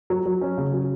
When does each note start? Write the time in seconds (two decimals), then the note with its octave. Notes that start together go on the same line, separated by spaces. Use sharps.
0.10 F#3
0.25 F#3
0.41 C#4
0.58 C#3
0.74 F#3